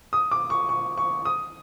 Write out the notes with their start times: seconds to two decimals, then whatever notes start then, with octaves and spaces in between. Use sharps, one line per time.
0.13 D#6
0.31 D6
0.50 C#6
0.69 C#6
0.97 C#6
1.25 D#6